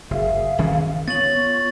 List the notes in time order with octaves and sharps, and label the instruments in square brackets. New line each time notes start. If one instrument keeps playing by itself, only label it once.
[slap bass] F#1 [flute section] G#4 E5 F5
[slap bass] E1 D#3 C#4
[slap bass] B3 [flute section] F4 C#5 C#6 [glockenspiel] A6 F#7